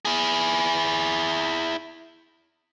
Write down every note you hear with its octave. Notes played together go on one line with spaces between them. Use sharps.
E4 G#4